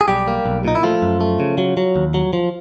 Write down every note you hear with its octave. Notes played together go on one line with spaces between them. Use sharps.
G#4
B1 G3 G4
A#3
B1
A#2 D#4
E4
F3 A3 F4
F#2
A3
C#3
F#3
F#3
D#2
F#3
F3